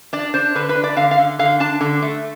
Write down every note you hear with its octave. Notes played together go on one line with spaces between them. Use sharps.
D4 D5
D4 C5
D3 B4
B4
D4
D5
D3 F5
F5
D3
D3 F5
D4 A5
D3
A3